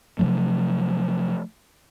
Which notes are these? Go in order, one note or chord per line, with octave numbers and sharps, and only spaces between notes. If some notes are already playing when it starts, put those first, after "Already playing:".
C3 F3 F#3 A3